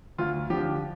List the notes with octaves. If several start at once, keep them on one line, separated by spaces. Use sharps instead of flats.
D2 F4
D3 F3 G4